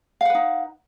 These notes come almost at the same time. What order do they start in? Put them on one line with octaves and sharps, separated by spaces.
F5 F#5 B4 D#4